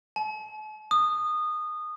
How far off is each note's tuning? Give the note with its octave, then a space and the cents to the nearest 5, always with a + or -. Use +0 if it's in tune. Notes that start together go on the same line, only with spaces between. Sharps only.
A5 -45
D#6 -20